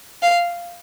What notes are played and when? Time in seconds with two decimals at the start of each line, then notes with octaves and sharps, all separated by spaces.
0.23 F5